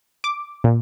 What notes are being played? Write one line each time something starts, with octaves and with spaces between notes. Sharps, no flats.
D6
A#2